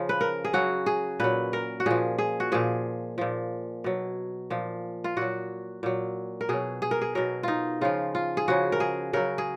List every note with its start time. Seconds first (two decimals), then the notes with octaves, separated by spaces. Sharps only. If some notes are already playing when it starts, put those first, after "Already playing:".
Already playing: C#3 F3
0.09 B4
0.21 A#4
0.45 G#4
0.53 C#3 F#3 F#4
0.86 G#4
1.20 A#2 F#3 B4
1.53 A#4
1.80 F#4
1.86 A#2 F3 G#4
2.18 G#4
2.40 F#4
2.52 A#2 F3 G#4
3.18 A#2 F3
3.84 B2 F#3
4.50 A#2 F3
5.04 F4
5.16 A#2 F#3 F#4
5.83 A#2 F#3
6.41 A#4
6.49 B2 F#3 G#4
6.82 G#4
6.91 A#4
7.01 G#4
7.15 B2 F#3 A#4
7.43 D#4 F4
7.81 C#3 F3 F4
8.15 F4
8.37 G#4
8.48 C#3 F3 F#4
8.72 A#4
8.80 G#4
9.13 C#3 F#3 A#4
9.38 G#4